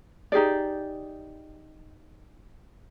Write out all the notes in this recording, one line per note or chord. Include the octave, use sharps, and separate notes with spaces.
D#4 G4 G#4 D5